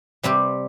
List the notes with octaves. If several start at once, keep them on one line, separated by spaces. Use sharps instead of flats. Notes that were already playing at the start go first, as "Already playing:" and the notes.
C3 G3 C4 G4